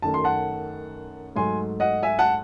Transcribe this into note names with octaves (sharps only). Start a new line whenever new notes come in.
F#2 D#3 A3 A5
C6
F#5 A5
G#2 F#3 A3 G#5 C6
D#5 F#5
E5 G#5
F#5 A5